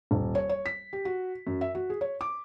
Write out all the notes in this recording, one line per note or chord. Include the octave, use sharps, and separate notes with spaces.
D#1
C#5
C#5
B6
G4
F#4
F#2
E5
F#4
G#4
C#5
D6